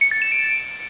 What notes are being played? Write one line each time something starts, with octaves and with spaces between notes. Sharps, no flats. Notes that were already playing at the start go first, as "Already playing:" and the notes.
C#7
A6
E7
D7